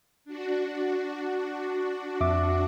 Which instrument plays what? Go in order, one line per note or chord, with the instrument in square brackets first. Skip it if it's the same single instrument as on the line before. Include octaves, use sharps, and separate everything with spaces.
[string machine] D4 F#4
[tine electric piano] F2 E5 D6